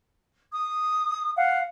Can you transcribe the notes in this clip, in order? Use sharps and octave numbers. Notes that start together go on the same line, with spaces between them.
D#6
F5 F#5